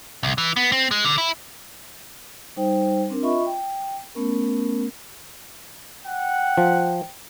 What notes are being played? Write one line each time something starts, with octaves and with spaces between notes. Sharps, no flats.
C2
E3
B3
C4
G#3
D3
E4
G3 D#4 C5 G5
C4 D4 A#4
F4 D#5 E5 B5 C#6
G5
A3 B3 C#4 A#4
F#5 G5
F3